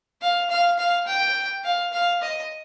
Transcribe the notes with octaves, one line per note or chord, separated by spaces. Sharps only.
F5
F5
F5
G5
F5
F5
D#5